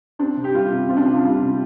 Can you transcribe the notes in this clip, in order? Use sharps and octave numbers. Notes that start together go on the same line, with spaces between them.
C4 D4
C3
G4
G3 F4
C3
C4 F4
D4
F4
C3
D4
G3 F4
C3